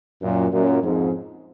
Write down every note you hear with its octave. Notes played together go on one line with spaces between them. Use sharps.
F#2 A#2
F#2 A#2
F2 G#2